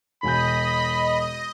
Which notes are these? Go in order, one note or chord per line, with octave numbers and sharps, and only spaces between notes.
E1 D#5 G#5 B5 G6